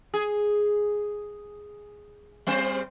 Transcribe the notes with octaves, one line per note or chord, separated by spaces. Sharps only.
G#4
G3 C4 C5